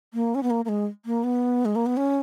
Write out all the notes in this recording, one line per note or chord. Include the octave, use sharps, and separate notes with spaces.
A#3
C#4
B3
A#3
A#3
G#3
A#3
B3
G#3
A#3
B3
C#4